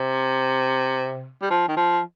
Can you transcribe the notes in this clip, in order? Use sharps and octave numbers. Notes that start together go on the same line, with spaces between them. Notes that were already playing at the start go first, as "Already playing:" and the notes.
Already playing: C3
G3
F3
D#3
F3